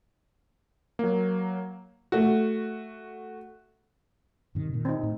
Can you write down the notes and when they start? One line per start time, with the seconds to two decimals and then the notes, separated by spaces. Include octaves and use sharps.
0.99 F#3 A#3
2.12 A3 F#4
4.55 G2 C3 D#3
4.74 A#2 D#3
4.85 C4 D#4
5.03 A2